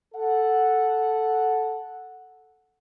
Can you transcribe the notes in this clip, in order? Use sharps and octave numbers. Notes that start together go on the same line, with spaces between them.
A4 F#5